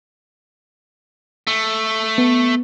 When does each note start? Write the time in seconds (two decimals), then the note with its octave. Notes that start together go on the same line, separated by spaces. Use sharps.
1.47 A3
2.18 B3